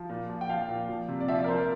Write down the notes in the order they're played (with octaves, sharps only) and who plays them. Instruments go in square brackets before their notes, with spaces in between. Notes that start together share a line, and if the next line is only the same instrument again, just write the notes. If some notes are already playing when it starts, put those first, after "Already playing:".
Already playing: [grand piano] F3
A#2
F3
G5
F3 F5
A#2
F3
C3
D5
F3 E5
D5
A#4
F3 C5
A#4